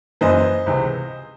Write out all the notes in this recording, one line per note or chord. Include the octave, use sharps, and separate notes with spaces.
F#1 F#2 E3 C5 D#5
C#2 C3 E3